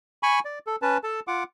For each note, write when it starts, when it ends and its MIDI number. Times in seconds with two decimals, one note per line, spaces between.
0.23 0.39 80
0.23 0.39 83
0.23 0.39 85
0.45 0.59 74
0.67 0.76 69
0.82 0.97 61
0.82 0.97 71
0.82 0.97 81
1.03 1.20 69
1.03 1.20 81
1.27 1.44 65
1.27 1.44 78
1.27 1.44 86